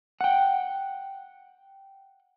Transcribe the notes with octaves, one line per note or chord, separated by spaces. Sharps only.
F#5 G5